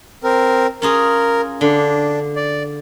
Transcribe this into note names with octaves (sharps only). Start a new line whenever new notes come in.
C4 A#4
C#4 F4 G#4 A#4
D3 D4
D5